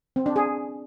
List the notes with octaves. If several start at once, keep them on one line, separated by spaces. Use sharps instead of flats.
C4
D4
G#4